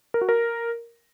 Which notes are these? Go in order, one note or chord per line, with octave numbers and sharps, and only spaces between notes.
A#4
F#4
A#4